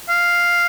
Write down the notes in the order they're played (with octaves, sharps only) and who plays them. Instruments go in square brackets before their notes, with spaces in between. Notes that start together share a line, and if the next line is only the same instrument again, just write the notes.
[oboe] F5